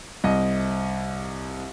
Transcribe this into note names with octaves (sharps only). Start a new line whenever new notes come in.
C2 D#5